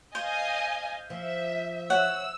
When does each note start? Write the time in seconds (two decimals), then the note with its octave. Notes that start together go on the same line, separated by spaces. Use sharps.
0.15 C5 D#5 F5 G#5 G6
1.10 F3 E5
1.90 C#5 E5 F#5 E6